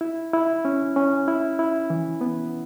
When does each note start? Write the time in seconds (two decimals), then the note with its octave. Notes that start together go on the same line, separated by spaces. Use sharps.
0.01 E4
0.33 E4
0.65 C#4
0.96 C#4
1.28 E4
1.59 E4
1.90 E3
2.21 B3